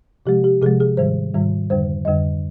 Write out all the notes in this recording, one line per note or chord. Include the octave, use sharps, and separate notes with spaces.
C3 F3 G#3 G4
G4
C3 F3 G#3 G#4
G#4
G#2 D#3 G3 C5
G#2 D#3 G3
F2 D3 G3 C5
F2 D3 G3 D#5